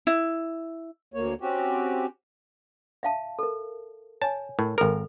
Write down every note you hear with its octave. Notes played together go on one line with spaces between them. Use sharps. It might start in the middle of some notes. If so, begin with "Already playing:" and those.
E4
D2 A#3 C#5
C4 C#4 F#4 G4
E5 F5 A5
A4 A#4
C#5 G#5 A5
A2 A#4
G#1 A4 A#4